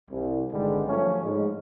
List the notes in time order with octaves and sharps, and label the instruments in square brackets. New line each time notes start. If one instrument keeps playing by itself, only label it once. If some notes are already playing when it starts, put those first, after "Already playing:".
[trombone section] C2
G#1 G2 D3 G3 G#3
F3 F#3 A3 C#4
G#2 G#3